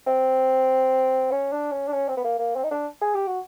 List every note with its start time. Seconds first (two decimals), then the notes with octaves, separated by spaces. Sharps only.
0.07 C4
1.31 C#4
1.52 D4
1.72 C#4
1.88 D4
1.93 C#4
2.08 C4
2.17 B3
2.24 A#3
2.39 A#3
2.55 C4
2.64 D#4
2.71 D4
3.01 G#4
3.15 G4
3.27 F#4